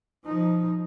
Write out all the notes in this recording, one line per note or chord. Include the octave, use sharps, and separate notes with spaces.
F3 D#4